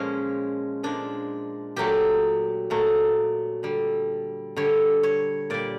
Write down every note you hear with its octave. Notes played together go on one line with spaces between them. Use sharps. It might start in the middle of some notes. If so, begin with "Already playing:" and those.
Already playing: A#2 F3 G#3 C#4
A#2 F3 G#3 D4
A#2 F#3 A3 G4
A#2 F#3 A3
D3 G3
D3 G3 C#5
C#5
A#2 G3 D5